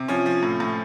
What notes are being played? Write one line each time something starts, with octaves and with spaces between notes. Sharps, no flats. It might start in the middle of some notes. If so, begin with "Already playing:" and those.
Already playing: C3
F3 C#4
F3
A2
A2